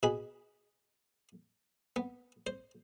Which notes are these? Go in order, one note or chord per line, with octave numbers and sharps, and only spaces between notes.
B2 G#4 B5
B3
C5